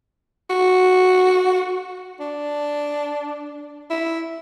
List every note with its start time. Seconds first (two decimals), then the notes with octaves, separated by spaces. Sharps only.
0.50 F#4
2.20 D4
3.90 E4